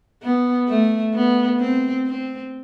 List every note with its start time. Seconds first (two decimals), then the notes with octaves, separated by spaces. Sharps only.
0.22 B3
0.68 A3
1.14 B3
1.59 C4
2.06 C4